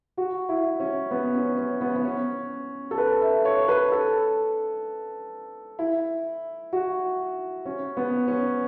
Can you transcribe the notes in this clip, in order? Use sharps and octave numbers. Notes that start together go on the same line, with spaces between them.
F#4
E4
C#4
B3
C#4
C#4
B3
B3
C#4
A4
B4
E5
C#5
B4
A4
E4
F#4
C#4
B3
C#4